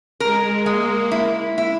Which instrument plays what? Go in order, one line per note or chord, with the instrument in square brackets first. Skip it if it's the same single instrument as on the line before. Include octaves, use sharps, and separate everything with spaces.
[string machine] G#3 [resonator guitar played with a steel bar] A#4
[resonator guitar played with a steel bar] G#3 [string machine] A#3
[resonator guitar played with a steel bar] E4
E4